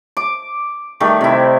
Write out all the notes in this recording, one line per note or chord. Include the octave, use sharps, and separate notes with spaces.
D6
D#3 G3 A3
C3 E4